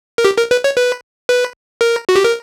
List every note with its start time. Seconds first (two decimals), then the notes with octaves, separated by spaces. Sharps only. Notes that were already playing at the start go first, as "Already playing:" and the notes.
0.18 A#4
0.25 G4
0.38 A#4
0.51 B4
0.64 C#5
0.77 B4
1.29 B4
1.81 A#4
2.09 F#4
2.16 G4
2.24 A#4